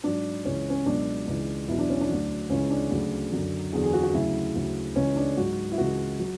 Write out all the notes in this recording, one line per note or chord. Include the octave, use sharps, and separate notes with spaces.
G#2 F#3 D4
C#2 C#3 E3 C#4
C#4
C#2 B2 F#3 D4
C#2 C#3 E3
E2 B2 F#3 E4
D4
C#4
D4
D2 D3 F#3
C#2 C#3 E3 C#4
D4
D2 C#3 F#3
F#2 D3 F#3
E2 D3 F#3 G#4
G#4
F#4
F#4
D2 C#3 F#3 E4
D2 C#3 F#3
C#2 C#3 E3 C#4
D4
G#2 F#3 F#4
E4
C#2 C#3 E3 F#4
F#3